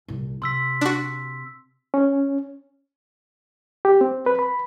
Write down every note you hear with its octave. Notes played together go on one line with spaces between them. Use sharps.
C2 A#2
C3 C6 E6 B6
D4 F#4
C#4
G4
C4
B4
B5